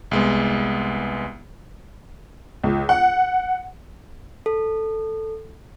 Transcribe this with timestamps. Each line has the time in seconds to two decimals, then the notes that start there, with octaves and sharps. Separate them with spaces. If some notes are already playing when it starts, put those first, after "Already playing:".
0.11 C2 G#3 B3
2.64 C#2
2.89 F#5
4.46 A4